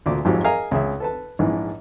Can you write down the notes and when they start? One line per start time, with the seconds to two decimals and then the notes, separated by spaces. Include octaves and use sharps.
0.06 D2 A#2 D6
0.25 G#1 F2 G#2 F#3 F4 G4
0.44 G#4 A#4 D#5 F5 G#5 A#5
0.71 C#2 G#4 E5
1.00 A4 B4 A5
1.39 A#1 G#2 E3